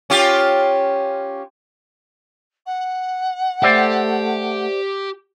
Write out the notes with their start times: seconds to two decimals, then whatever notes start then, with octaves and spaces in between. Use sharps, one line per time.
0.10 C#4 F4 G4
2.66 F#5
3.63 A3 G4 C5 D5 E5